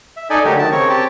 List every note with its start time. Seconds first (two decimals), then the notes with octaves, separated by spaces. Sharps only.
0.17 E5
0.30 D#4 A4 D5 D#5 G#5
0.45 D3 F#3 A3 G4 A#4
0.59 D#3 A5
0.72 C#3 C4 A#4 C#5 C#6
0.89 C4 G4 G5 A5